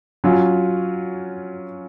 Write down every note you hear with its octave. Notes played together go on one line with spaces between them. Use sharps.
F#3 C#4 F4